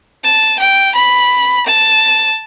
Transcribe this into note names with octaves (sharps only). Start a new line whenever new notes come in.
A5
G5
B5
A5